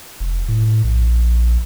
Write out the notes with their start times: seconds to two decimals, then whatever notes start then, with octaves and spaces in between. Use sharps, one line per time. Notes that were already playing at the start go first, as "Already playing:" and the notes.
0.20 F1
0.49 A2
0.84 A#1